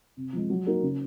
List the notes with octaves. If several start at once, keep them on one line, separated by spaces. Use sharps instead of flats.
C3
F3 G#3
F#3
A#3 D#4 F#4 A#4
C#3